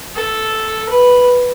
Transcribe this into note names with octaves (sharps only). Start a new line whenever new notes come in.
A4
B4